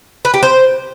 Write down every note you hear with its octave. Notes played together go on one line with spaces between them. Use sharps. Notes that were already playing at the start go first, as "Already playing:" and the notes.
B4
G4
C5